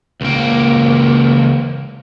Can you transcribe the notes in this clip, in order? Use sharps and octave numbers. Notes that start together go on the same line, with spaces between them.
C#2 A#3